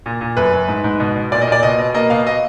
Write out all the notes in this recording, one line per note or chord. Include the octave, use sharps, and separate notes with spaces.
A#2
A#2
F#2 B4
F#2
G#2
G#2
B2
B2
A#2 D5
D#5
A#2 D5
B2 D#5
B2
A#3 D#5
B2 F5
D#5